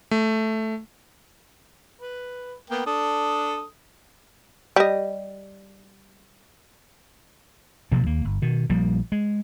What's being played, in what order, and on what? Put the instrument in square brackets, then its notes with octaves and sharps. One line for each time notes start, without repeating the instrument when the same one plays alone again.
[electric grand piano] A3
[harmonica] B4
A#3 B3 G5
D4 A4 D#6
[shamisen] G3 D#5
[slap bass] A1 B2 F3 A#3
D#2 A#3
G1
B2 D#3
A#1 F3 G3 A#3
G#3